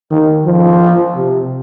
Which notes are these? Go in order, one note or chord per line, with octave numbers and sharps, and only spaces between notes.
D#3
F3
C3